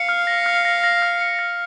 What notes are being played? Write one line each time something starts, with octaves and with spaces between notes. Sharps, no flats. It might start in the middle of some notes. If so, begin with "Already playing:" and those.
Already playing: F5 C#7
F6
A#6
F6
A#6
A#6
F6
C#7
A#6